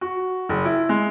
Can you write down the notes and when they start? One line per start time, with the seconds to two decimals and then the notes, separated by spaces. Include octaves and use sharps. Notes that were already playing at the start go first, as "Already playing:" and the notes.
0.01 F#4
0.49 F#1
0.65 E4
0.89 G#3